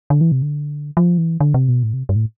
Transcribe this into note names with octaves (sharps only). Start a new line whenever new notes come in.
D3
E3
C3
D3
F3
E3
D3
C3
B2
A2
C3
G2
A2